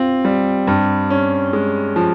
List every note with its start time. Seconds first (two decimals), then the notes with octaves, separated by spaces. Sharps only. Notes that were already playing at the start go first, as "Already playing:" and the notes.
Already playing: C4 F4
0.25 G3
0.67 G2
1.10 C#4
1.53 G#3
1.96 F3